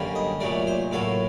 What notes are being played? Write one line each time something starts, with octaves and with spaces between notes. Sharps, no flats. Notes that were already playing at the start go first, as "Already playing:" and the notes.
Already playing: F#2 D3 G3 A#3
D#5
A#2 F#3 A3 D5
C5
A2 F#3 A#3 A4